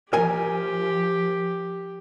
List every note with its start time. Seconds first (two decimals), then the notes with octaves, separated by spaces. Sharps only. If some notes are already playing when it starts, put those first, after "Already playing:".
0.13 F3 G4 A#4 G#5